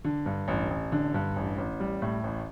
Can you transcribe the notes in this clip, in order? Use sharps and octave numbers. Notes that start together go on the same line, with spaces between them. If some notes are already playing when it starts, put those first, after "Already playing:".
D3
G2
A1
A1
D3
G2
A1
A1
G3
A2
A1